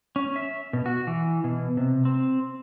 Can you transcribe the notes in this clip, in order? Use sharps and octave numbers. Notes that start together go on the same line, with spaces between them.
C#4
E5
B2
F#4
E3
B2
C3
C4